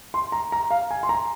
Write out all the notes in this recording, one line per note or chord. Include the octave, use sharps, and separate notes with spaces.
C6
A#5
A#5
F5
G#5
C6
A#5